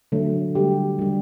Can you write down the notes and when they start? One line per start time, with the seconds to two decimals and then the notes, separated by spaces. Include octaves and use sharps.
0.12 D3 F#3 A3
0.55 D3 G3 G4
0.99 D3 G3